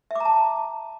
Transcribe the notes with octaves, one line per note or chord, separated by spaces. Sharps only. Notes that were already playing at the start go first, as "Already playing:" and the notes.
E5 A5 A#5 D6